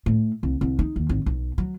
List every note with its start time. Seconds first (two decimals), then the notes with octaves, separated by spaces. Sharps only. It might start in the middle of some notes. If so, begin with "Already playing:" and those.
0.06 A2
0.43 C2
0.61 C2
0.79 D#4
0.96 D#2
1.09 G#1
1.26 B1
1.58 F#3